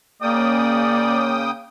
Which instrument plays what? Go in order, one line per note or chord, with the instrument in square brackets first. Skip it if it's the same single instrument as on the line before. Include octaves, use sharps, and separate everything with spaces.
[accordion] C#3 G5 D#6 [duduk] A#3 [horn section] C#4 D5